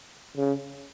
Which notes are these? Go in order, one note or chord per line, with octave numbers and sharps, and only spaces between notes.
C#3